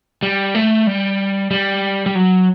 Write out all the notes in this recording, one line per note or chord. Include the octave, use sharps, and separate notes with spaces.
G3
A3
G3
G3
G3
F#3